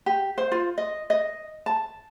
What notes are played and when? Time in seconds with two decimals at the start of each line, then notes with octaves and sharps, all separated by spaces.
0.06 G4
0.38 C5
0.52 F4
0.78 D#5
1.10 D#5
1.66 A5